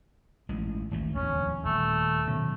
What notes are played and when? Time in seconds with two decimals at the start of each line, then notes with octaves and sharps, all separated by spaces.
0.49 A1 G#3
0.91 G#1 D2 A3
1.15 D1 E2 C#4
1.65 D#1 A3
2.27 B2 D#3 F#3